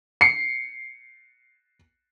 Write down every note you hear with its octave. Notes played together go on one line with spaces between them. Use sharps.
C7 C#7